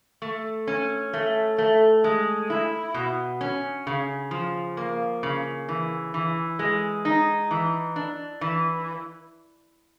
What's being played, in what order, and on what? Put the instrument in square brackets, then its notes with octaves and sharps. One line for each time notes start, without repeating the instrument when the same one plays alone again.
[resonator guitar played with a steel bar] A3
C#4
A3
A3
G#3
E4
B2
C#4
C#3
F3
A#3
C#3
E3
E3
G#3
D#4
E3
D4
E3